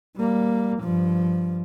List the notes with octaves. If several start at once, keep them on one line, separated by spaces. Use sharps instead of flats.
G3 A#3
G2 F3